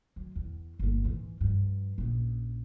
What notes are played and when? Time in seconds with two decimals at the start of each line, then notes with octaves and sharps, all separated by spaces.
0.16 F#3
0.35 E2
0.79 G1 A#3
1.04 G#2 E3
1.41 G2 F3
1.98 A#1 C#3